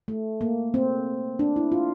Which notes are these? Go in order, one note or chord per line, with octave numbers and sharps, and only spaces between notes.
A3
A#3
C4
D4
E4
F4